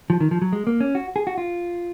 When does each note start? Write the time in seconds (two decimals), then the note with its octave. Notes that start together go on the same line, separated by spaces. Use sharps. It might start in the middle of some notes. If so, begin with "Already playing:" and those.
0.10 F3
0.21 D#3
0.31 F3
0.42 F#3
0.53 G#3
0.67 A#3
0.80 C#4
0.95 F#4
1.16 G#4
1.27 F#4
1.38 F4